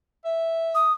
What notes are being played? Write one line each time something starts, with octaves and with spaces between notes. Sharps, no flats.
E5
D#6